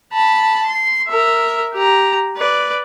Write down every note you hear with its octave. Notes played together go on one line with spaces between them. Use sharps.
A5 B5
C6
A#4 E5
G4 A#5
B4 D5